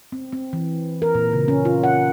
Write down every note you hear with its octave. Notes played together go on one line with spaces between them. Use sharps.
C4
C4
E3
A#4
A#2
C#3
C#4
F4
F#5